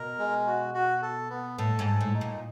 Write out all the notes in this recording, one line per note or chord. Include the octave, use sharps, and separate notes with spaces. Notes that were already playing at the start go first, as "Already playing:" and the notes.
Already playing: B2 A#4
G#3
F#4
F#4
A4
B3
A2 A4
G#2
A4
A2
D#4
A#2